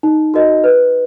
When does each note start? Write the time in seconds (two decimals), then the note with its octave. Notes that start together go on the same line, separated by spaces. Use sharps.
0.03 D#4
0.34 F#4 A#4 D#5
0.64 B4